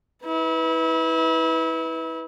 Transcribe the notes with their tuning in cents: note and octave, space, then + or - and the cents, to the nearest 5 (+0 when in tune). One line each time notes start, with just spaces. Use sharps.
E4 -30 B4 +0